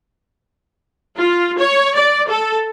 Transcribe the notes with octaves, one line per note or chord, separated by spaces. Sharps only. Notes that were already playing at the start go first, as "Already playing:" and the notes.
F4
C#5
D5
A4